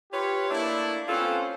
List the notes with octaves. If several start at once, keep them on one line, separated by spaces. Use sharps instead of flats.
F4 G4 B4 C#5
A3 A#3 D4 E4
C4 C#4 F4 A4 B4 C5